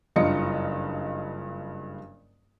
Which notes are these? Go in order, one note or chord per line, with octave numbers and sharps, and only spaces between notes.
F#1 G2 F4 D#5 C#7